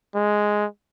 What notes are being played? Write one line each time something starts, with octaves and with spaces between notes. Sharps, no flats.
G#3